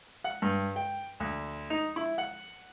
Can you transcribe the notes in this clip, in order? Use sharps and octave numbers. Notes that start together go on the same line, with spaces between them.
F#5
G2
G5
D2
D#4
E4
F#5